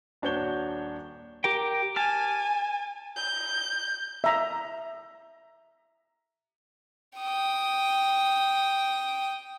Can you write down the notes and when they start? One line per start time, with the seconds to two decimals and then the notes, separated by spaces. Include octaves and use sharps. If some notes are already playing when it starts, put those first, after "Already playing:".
0.22 D#1 D4 F#4 C#5 G6 G7
1.44 G4 A#4 G5
1.96 G#5 A5 F6
3.16 G6
4.24 E5 A#5
7.18 G5 D#6